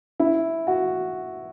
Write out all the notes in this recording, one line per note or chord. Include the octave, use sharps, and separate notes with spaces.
E4
F#4